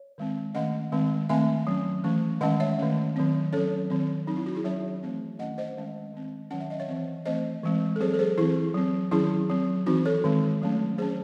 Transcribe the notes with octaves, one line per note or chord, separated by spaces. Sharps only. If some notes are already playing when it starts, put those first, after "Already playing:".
Already playing: C#5
D#3 G#3 C4
D#3 A3 C#4 D#5 F#5
D#3 G#3 C4
D#3 A3 C4 E5 G#5
F#3 C#4
E3 A3 C#4
D#3 G#3 C#4 D#5 F#5
C#5 E5
D#3 A3 C#4
D#3 F#3 C4
F#3 C#4 A4 C#5
D#3 F#3 C4
F#3 C4 D#4
E4
D#4 F#4
E4 G#4
F#3 C#4 C#5 E5
E3 A3 C4
D#3 A3 C#4 D#5 F#5
C5 D#5
D#3 G#3 C#4
D#3 G#3 C4
D#3 F#3 C#4 F#5
E5
D#5
C#5 E5
E3 C4
E3 A3 C4 C5 D#5
E3 G#3 C4
A4
F#3 C4 G#4 C5
A4
G#4 C5
E3 C4 E4 G#4
F#3 C4
D#3 F#3 C#4 E4 G#4
F#3 C4
E3 C4 D#4 F#4
A4 C#5
D#3 G#3 C4
F#3 A3 C#4
F#3 C#4 G#4 C5